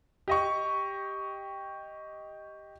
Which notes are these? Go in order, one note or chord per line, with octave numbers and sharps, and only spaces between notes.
G4 D#5 C#6